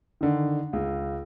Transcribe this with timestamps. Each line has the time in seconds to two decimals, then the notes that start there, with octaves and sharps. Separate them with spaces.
0.21 D3 D#3
0.73 C#2